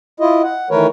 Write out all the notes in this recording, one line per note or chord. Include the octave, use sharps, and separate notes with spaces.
E4 F4 D#5
F#5
D#3 E3 A3 A#4 B4 C#5